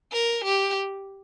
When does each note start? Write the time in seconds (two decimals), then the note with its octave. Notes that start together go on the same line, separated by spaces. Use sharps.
0.12 A#4
0.44 G4